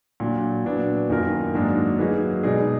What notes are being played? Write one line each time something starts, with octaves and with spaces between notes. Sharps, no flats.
A#2 F#3 D4
A#2 F#3 B3 D4
F#2 D#3 A#3 F4 A#4
G#2 F#3 A#3 D4
F#3 A#3 D#4 G#4 B4
B2 G#3 D#4 G#4 D5